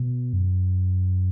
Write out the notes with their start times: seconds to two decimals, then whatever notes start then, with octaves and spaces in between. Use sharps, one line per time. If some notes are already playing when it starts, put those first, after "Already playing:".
Already playing: B2
0.33 F#2